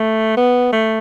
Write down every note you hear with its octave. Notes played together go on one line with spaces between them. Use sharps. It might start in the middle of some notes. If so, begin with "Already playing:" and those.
Already playing: A3
B3
A3